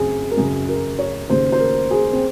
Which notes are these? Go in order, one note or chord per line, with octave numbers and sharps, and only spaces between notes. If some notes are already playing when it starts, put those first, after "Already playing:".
Already playing: F#2 C#3 C4 G#4
A#4
F#2 C#3 G#4
A#4
C#5
D#2 C#3 C5
C5
A#4
G#4
C4